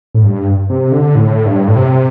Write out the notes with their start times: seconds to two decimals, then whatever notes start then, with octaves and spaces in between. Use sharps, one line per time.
0.14 A2
0.23 G2
0.70 C3
0.92 D3
1.15 A2
1.46 G2
1.68 A2
1.76 C3